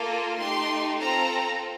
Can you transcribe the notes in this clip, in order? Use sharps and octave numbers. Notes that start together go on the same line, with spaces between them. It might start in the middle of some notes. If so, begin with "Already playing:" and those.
Already playing: A#3 F4 A4
A3 D#4 G4 C6
C4 F4 A4 A#5